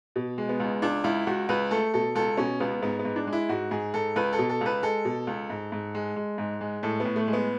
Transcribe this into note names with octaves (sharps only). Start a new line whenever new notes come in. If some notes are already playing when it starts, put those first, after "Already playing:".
B2
G#3
B3
C#2
C#2 D4
C#2 E4
C#2 F#4
C#2 B4
A3 A4
B2 A4
C#2 A4
B2 C#4
C#2 B3
G#2 B3
B3
G#2
D4
G#3
E4
G#2 F#4
G#2 G#4
G#2 A4
C#2 B4
A4
B2
A4
C#2 B4
G#3 A4
B2
C#2
G#2
G#2
G#3
G#3
G#2
G#3
A2 A4
B3
A2
A3
G#3
B3